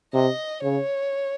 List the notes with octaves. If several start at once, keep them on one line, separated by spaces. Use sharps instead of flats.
C3 D#5
C#3 C#5